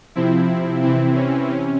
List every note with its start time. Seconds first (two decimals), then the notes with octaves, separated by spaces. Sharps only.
0.15 C3 F3 C4 E4
0.83 C3 E3 C4 E4
1.16 C#4
1.50 C3 C#4